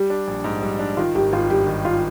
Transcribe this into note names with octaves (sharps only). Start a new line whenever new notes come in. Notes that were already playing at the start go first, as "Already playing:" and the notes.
Already playing: G3 G4
D4
A#1
G#2
G3
D4
D#3 F4
G#1 G4
G#1 F4
G2 G4
D#3
F4